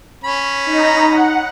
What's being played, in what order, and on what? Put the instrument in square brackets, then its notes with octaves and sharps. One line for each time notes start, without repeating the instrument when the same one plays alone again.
[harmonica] C#4 B5
[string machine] D#4 A#5
F#5